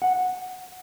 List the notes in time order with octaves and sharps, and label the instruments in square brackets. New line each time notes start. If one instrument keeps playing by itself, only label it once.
[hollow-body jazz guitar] F#5